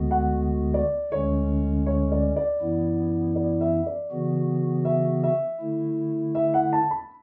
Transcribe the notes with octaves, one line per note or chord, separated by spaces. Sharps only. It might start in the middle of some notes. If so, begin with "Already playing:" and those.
Already playing: D2 D3 G#3 B3 F#4
F#5
D5
D2 D3 G#3 C#4 C#5
C#5
D5
D5
F#2 E3 B3 E4
D5
E5
D5
C#3 E3 B3 F#4
E5
E5
D3 A3 E4
E5
F#5
A5
B5